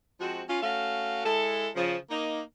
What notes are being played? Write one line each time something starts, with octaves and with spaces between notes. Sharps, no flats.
F3 G#3 C4 F#4
C#4 F4
A3 C#4 F#4 F5
G#3 E4 A4
C#3 F3
A#3 D#4